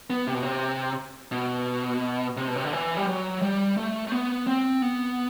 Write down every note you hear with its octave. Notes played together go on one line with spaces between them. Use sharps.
B3
C3
B2
C3
B2
C3
B2
C3
D3
E3
G3
F#3
G3
A3
A3
B3
C4
B3